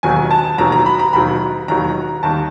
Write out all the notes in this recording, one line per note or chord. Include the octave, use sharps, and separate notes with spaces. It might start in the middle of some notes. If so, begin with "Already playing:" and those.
E1 D#2 D#3 F#3 G#5
A5
E1 D#2 D#3 F#3 A#5
A#5
B5
A#5
E1 D#2 D#3 F#3 B5
E1 D#2 D#3 F#3 A#5
D#2 D#3 G3 A5